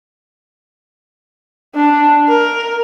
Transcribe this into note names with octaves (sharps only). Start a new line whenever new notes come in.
D4
A#4